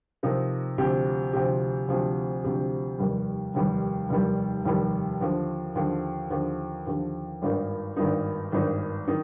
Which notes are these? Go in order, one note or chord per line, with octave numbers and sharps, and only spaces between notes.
C3 F3 A#3 D#4
D2 C3 F3 C4 G4
D2 C3 F3 C4 G4
D2 C3 F3 C4 G4
D2 C3 F3 C4 G4
F1 D#2 D#3 G3
F1 D#2 D#3 G3
F1 D#2 D#3 G3
F1 D#2 D#3 G3
D#2 D3 F3
D#2 D3 F3
D#2 D3 F3
D#2 D3 F3
G#1 G2 D#3 A#3 D#4
G#1 G2 D#3 A#3 D#4
G#1 G2 D#3 A#3 D#4
D#3 D#4